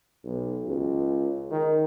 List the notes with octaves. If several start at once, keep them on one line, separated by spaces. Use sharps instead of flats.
B1
C#2
D#3